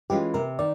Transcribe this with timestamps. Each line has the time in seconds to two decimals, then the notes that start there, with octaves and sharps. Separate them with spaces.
0.10 E3 G#3 C#4 F4 G4
0.34 C3 A#4
0.59 D#3 D5